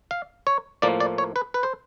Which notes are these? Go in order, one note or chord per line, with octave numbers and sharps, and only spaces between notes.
F5
C#5
A2 F3 A#3 D5
D5
C#5
B4
B4
C5